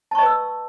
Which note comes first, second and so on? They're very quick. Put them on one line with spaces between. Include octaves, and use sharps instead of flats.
A5 C#6 D#5 B4 E6